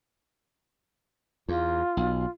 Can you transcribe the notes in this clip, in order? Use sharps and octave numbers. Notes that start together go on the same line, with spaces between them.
E2 F4
B1